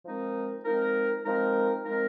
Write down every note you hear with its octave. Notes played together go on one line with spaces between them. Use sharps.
F3 G#3 C4 D#4 A#4
F3 G#3 C4 D#4 A#4
F3 G#3 C4 D#4 A#4
F3 G#3 C4 D#4 A#4